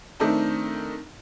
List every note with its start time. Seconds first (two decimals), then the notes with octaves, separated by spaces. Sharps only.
0.20 D#3 A3 C4 D4 D#4